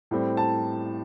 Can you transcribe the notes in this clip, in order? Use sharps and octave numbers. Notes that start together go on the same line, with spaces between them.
A2 G3 C4
A5